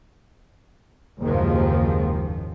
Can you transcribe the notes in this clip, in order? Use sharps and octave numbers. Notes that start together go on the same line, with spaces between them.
F#1 D#2 G#2 D#3 F3